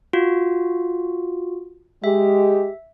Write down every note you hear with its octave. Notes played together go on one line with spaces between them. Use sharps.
F4 F#4
G#3 G4 E5